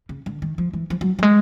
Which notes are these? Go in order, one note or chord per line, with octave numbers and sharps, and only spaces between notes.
C#3
D3
D#3
F3
E3
F3
F#3
G3
G#3